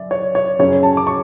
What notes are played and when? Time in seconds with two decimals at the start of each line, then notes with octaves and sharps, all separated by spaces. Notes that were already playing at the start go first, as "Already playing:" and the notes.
Already playing: F#2 D5 E5
0.11 C#5
0.35 C#5
0.59 F#2 C#3 F#3 C#4 C#5
0.83 A5
0.97 D6
1.07 C#6